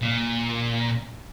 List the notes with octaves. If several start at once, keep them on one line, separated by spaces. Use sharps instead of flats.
A#2